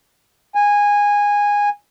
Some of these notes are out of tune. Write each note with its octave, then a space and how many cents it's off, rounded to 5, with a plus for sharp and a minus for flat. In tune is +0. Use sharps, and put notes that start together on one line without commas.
G#5 -15